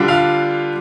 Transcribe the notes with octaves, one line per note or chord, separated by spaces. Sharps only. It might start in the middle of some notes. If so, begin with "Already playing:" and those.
Already playing: D3 G3 D4 F4
F5 F6